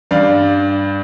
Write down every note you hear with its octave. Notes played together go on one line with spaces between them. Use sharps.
G2 D5 F5